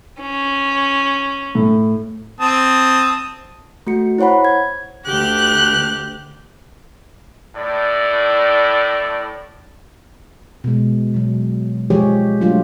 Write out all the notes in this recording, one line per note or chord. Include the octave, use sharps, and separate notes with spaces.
C#4
A2
C4 A5 D#6
A3 F#4 C#7
E4 C5 C#5 F#5 B5
G#6
D2 G4 F#6
A2 D5
B2 G#3
B2 F#3
F3 G#3 G4 G#4 C5 C#5
F#3 A3 D4 F4